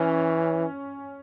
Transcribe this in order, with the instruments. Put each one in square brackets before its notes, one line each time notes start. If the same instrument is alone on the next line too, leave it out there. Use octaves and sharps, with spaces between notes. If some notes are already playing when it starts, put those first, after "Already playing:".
Already playing: [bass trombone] E3 [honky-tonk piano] C#4